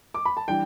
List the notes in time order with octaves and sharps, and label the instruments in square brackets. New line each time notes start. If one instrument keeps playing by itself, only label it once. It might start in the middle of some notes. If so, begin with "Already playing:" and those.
[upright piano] D6
B5
A5
[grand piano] E3 G3 D4 [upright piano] G5